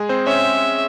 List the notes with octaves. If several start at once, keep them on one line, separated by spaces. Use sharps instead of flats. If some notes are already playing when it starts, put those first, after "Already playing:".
Already playing: G#3 G#4
C4 C5
C#4 C#5 E5